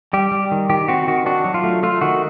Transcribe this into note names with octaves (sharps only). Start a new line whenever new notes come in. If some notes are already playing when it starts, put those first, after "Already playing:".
G3 G4
G3
D#3
D#3 G4
C4 F#4
D#3 F#4
D4 F#4
F#3
F4
A3
A3 F4
D#3 F#4